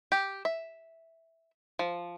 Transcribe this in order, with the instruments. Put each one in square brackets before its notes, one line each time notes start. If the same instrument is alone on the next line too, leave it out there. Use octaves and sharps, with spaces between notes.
[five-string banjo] G4
E5
F3